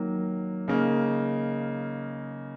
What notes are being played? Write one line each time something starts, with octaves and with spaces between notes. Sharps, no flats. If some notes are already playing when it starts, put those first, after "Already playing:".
Already playing: D#3 F#3 A#3
C#3 A#3 D#4